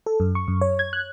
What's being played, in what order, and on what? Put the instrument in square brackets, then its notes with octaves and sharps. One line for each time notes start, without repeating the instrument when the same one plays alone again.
[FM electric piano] A4
F#2
C#6
F#2
C#5
G#6
F#6